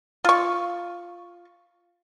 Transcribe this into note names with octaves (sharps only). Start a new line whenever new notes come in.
F4 C#6